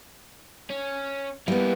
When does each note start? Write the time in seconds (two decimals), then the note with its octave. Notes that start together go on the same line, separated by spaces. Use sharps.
0.70 C#4
1.48 G3 A#3 B3 E4